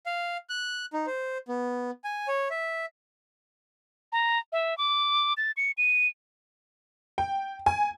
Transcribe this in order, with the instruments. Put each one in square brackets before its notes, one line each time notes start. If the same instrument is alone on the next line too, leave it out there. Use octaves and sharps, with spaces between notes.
[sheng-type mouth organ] F5
F#6
D#4
C5
B3
G#5
C#5
E5
[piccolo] A#5
E5
D6
A6
C#7
D#7
[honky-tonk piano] G5
G#5